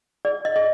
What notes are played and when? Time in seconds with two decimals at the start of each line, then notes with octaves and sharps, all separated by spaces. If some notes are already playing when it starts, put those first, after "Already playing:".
0.25 G#4 D5
0.45 D#5
0.56 G#4 D#5